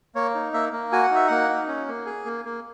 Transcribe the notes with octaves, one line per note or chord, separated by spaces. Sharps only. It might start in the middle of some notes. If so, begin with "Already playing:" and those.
A#3 C#5
D#4
A#3 E5
A#3
F#4 G#5
F#5
D#4 E5
A#3 F#5
D#4
C#4
A#3
G#4
A#3
A#3